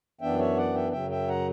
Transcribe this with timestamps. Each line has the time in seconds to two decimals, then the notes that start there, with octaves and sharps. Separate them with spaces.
0.21 F#2 E3 B3 D4 E5 G5
0.39 C#5 E5
0.57 D5 F#5
0.74 E5 G5
0.92 F#2 C#3 F#3 E5 G5
1.10 E5 G5
1.28 F#5 A#5